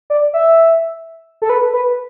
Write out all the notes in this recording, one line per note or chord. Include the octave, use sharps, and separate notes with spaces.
D5
E5
A4
B4
B4